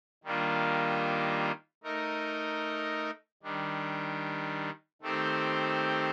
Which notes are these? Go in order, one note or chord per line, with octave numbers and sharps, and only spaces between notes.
D#3 G3 A#3 D4 F4
A3 D#4 A#4 D#5
D#3 G3 D4
D#3 A3 C4 G4 C5